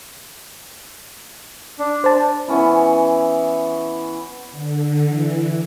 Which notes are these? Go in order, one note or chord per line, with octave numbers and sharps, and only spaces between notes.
D4
C5 A5
E3 B3 C#4 E4
D3
E3